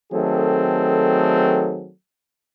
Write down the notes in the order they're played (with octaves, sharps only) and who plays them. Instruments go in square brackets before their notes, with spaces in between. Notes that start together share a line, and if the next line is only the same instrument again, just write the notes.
[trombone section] D#3 F#3 A3 C4 G#4 A4